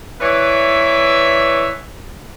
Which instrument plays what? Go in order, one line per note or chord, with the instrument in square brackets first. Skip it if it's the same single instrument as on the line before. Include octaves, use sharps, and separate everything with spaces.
[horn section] E3 B4 C#5 D5 E5